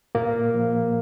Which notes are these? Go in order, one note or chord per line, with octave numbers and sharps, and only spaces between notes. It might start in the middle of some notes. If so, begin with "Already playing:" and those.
A#2 A#3
F3